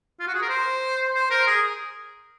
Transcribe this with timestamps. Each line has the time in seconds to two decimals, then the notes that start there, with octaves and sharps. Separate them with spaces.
0.20 F4
0.27 F#4
0.34 G#4
0.42 A#4
0.49 C5
1.14 C5
1.31 A#4
1.47 G#4